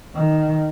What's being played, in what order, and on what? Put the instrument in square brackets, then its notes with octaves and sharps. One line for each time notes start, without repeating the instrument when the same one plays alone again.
[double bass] D#3